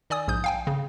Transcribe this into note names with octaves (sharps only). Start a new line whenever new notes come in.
D#3 D5 G#5 D#6
A#1 G#2 D#6 G6
F5 G5 G#5
C#3